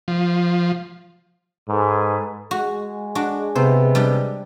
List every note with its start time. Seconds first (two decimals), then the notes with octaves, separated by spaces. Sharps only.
0.08 F3
1.68 G#2 G#4 A4 B4
2.51 G#3 F#4
3.15 D4 F#4
3.55 C3 B3 C5
3.95 G3 D4 G4